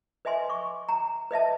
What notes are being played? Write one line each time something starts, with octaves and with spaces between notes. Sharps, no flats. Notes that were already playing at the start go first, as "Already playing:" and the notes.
B4 D#5 E5 G#5 C6
C#6 D6
A#5
B4 D#5 E5 A5